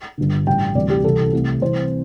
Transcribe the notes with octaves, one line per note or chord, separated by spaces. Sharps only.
G1 G2 D3
A1 G2 G3 G5
D2 C3 E3 G3 D5
G4
C2 C3 E3 G3 A4
C2 C3 A3
C2 C3 E3 C5